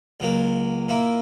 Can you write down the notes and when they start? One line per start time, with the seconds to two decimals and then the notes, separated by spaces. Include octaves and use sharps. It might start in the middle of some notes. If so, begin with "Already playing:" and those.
0.20 C#2 C#3 F#3 A#3
0.88 A#2 A#3 E4